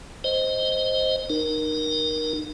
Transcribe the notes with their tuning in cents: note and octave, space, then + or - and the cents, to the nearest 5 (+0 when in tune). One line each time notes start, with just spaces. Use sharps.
C5 +0 D#5 +0
D#4 -30 A#4 +15